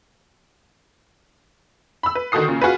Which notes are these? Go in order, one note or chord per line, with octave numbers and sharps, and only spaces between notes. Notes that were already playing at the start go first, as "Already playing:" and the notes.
B5 E6
B4
D3 D#3 F#4 A4 D#6 C7
A#2 C#3
F4 F#4 G#4 B4